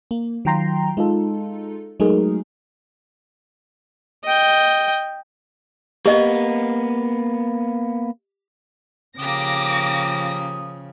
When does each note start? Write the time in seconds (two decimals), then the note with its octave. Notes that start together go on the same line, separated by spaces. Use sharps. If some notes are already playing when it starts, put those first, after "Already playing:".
0.11 A#3
0.45 D#3 F#3 F4 G5 A#5 C6
0.97 G#3 D#4 F4 A4
2.00 F#3 G#3 A3 D#4 G#4 A#4
4.24 D#5 G5
6.06 A#3 B3 G4 D#5
9.19 C#3 F3 A#3 G4 D6 D#6 A#6